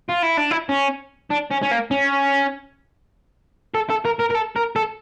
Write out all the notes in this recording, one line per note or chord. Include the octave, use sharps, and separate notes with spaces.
F4
E4
D4
E4
C#4
D4
C#4
C#4
A#3
C#4
A4
A4
A#4
A#4
A#4
A4
A#4
A4